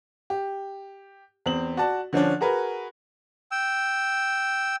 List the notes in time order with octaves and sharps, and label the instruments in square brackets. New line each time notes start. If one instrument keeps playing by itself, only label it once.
[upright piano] G4
E2 C4 F#7
F#4 D5 A5
D3 F3 C#4 D4
F#4 G#4 A#4 B4
[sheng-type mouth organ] G5 E6